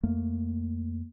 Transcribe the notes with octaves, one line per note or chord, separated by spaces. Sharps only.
F2 A3 A#3